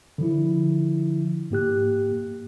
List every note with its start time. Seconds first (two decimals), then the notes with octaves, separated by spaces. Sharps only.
0.18 D3 F3 E4
1.50 G#2 A#3 G4 F#6